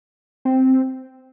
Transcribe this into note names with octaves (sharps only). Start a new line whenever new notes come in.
C4